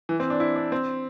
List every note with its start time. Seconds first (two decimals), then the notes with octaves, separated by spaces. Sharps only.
0.09 E3
0.20 C4
0.30 D4
0.40 E4
0.56 D4
0.72 C4